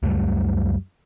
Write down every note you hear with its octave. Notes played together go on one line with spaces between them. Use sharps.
C#2 F#2 G3 A3